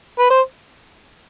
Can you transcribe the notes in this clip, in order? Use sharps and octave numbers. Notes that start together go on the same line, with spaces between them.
B4
C5